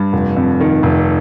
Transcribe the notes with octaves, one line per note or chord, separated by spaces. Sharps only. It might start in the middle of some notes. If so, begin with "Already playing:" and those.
Already playing: G2
F1
F2
D#3
F1